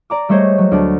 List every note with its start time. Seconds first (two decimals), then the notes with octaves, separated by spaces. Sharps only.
0.10 D5 A#5 D6
0.29 G3 A3 G#4 C5 C#5 D#5
0.58 F#3
0.72 D2 D4 A6